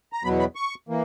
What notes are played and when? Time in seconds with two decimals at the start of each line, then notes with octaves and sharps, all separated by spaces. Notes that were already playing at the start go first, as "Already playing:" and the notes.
0.13 A#5
0.24 E2 B2 F#3 B3 B5
0.39 B5
0.55 C#6
0.89 E3 A#3